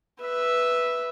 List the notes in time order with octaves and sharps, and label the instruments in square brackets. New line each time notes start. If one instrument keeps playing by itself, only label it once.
[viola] B4 E5